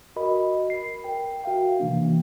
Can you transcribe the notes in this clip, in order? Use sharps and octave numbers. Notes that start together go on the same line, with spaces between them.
F#4 A#4 D#5 B5
C7
A#4 G5
F#4 E5 F5 G5
C3 E3 A#3 D4